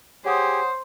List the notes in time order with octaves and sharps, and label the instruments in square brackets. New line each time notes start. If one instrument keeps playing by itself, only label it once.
[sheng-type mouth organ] G4 G#4 [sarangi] C5 [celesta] C#5 F#5 D#6